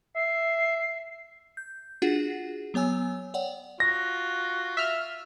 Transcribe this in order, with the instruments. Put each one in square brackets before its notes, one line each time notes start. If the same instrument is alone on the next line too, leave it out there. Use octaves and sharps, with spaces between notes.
[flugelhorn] E5 [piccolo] C7
[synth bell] G6
D4 F4 F#4 G#4 F#5
F#3 B3 C#5 G#5 E6
C#5 D5 F#5 G5
[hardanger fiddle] F4 [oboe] F#4 [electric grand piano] A#6
[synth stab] E5 F6